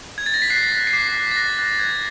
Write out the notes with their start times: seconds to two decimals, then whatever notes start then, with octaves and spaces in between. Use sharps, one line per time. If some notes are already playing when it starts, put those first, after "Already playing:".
0.18 G#6
0.26 A6
0.34 A#6
0.42 B6
0.50 F#6 C7
0.72 F#6
0.87 C7
0.93 D6 B6
1.15 F#6
1.31 A6
1.36 F#6 A#6
1.58 F#6
1.79 F#6 G#6